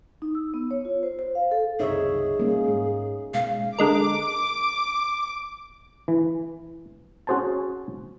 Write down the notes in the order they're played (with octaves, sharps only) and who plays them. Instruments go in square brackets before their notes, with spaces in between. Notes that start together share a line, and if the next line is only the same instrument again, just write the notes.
[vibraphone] D#4
E6
B3
C#5
F4
C5
C5
F5
A4
[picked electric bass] F#1 C2 F#2 [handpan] D#4 C#5 E5 [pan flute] G#4
[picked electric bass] G3 G#3 [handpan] A#3 C#4
[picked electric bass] G#2
[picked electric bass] B2 [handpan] G#3 [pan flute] F5
[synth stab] D3 G#3 A#4 [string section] D6
[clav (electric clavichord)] E3
C#4 F#4 G#4 C5 G#5 A5